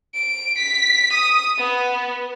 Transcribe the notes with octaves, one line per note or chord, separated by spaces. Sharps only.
D7
B6
D#6
B3